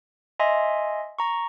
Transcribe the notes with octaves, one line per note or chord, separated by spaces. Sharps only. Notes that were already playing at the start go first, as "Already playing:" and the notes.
D#5 E5 G#5 C6
A#5 C#6